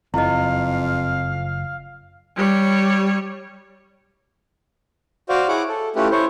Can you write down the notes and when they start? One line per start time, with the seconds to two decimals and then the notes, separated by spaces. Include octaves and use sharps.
0.14 F#1 F2 E4 D#5 F5
2.36 G3 C#5
5.29 F#4 C5 D5 F5
5.48 E4 G#4 C#5 F#5 D6
5.69 A4
5.96 A3 C#4 E4 F4 G4 B4
6.11 E4 C5 C#5